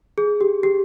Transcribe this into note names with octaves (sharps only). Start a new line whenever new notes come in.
G#4
G4
G4